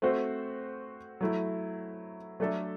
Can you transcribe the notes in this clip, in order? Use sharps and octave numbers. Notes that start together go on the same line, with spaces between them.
A3 C4 F#4 C5
F#3 A3 E4
F#3 A3 D4 A4 E5